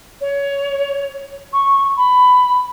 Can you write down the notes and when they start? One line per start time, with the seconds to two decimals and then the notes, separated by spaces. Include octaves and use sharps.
0.21 C#5
1.53 C#6
1.97 B5